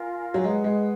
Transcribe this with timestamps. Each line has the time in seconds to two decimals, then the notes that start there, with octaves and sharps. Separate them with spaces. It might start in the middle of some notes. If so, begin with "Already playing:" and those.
Already playing: F4 A#4 F5 G#5
0.34 F#3
0.44 G#3 G#4 B4 F#5
0.64 G#3